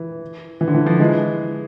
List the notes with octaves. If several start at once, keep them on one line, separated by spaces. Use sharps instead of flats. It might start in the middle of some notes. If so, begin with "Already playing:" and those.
Already playing: E3
E3
D3
E3
D3 F3
E3 G#3